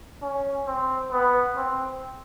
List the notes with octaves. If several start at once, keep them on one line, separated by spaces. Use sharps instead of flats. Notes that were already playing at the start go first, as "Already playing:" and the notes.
C#4
C4
B3
C4